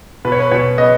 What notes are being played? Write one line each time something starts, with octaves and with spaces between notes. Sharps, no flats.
B2 B4
C#5
B4
B2 C#5
B3 D#5